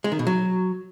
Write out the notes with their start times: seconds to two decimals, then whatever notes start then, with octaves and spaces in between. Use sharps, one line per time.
0.04 G#3
0.12 D#3
0.19 B2
0.27 F#3